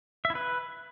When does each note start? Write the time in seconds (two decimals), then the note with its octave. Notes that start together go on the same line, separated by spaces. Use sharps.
0.25 E5
0.30 E4
0.35 B4